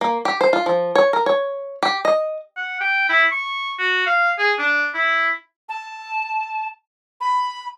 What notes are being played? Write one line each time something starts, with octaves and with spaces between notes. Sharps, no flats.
A#3
G4
C5
F4
F3
C#5
A#4
C#5
G4
D#5
F#5
G5
E4
C#6
F#4
F5
G#4
D4
E4
A5
B5